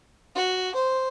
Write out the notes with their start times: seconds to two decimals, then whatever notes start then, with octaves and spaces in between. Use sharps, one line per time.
0.35 F#4
0.75 C5